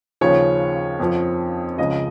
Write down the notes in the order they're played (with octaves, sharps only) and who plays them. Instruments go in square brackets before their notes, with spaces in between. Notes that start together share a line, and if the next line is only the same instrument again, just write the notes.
[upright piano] D#2 C#3 F3 C#5
F2 F3
C#2 C#3 F3 D#5